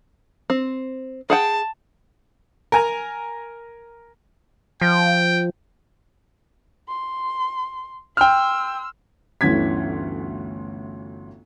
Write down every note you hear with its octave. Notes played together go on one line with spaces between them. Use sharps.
C4
G#4 F#5 G5 A5
A#4 G#5 A#5
F3 G5
C6
G5 C6 E6 F6
G1 D2 E3 C#4 G#6 B6